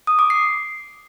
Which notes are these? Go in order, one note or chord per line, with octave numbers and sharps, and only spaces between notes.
D#6
D6
C7